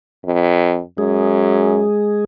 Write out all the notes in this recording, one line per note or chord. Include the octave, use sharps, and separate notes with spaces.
F2
F#2 G#3 G#4